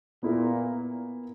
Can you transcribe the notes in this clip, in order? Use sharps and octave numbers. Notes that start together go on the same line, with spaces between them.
A#2 B3 E4 A#4